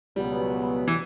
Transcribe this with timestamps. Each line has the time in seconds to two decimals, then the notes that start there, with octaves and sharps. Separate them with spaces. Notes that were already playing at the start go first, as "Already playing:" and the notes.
0.16 C#2 B2 F#3 G3 B3
0.88 E3